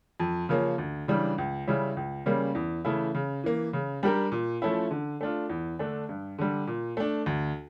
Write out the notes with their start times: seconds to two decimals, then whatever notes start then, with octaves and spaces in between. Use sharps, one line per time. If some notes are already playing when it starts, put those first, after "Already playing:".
0.20 F2
0.49 C#3 F3 A#3 C#4
0.78 D2
1.08 C#3 E3 G3 D4
1.38 C#2
1.67 C#3 G3 C#4 E4
1.97 C#2
2.26 C#3 G3 A#3 C#4
2.55 E2
2.85 C#3 E3 A3 E4
3.15 C#3
3.44 E3 A#3
3.73 C#3
4.03 G3 D4 G4 A#4
4.32 A#2
4.62 F3 A3 C#4 E4
4.91 D3
5.21 A3 D4 F4
5.50 E2
5.79 D3 A3 D4
6.09 G2
6.39 D3 G3
6.67 A#2
6.97 A3 D4
7.26 D2